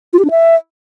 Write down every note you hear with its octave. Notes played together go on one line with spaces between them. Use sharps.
F4
G4
D4
E5